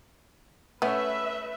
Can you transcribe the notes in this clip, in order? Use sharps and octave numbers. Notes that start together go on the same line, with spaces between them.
A3 B3 C#4 B4 E5